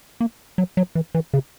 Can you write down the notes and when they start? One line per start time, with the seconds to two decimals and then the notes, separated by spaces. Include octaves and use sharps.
0.21 A#3
0.58 F#3
0.77 F#3
0.95 E3
1.15 E3
1.33 C#3